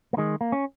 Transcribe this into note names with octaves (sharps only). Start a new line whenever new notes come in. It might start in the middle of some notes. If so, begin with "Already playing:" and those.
A#3
D#3 G#3
A#3
C#4